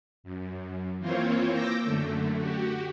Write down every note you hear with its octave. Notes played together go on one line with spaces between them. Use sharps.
F#2
E3 A#3 C4 F4 C5 C#5
D6 E6 G6 A#6
F#2 D3 A3
F#4 G4